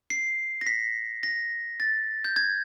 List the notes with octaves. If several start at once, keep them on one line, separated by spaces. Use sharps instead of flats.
C7
A#6
B6
A#6
A6
G6
G#6